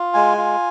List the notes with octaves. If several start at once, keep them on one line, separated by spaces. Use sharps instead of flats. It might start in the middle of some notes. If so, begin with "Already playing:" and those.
Already playing: F4
G#3 G#5
F4